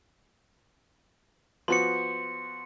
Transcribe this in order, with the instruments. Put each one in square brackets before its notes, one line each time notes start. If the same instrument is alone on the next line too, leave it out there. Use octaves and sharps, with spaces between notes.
[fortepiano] F3 B3 F#4 [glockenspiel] C6 C#7